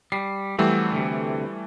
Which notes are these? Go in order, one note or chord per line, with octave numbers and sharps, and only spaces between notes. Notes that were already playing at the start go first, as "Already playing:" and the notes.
G3 C7
E3 F#3 G3 A3 C4
D2 C3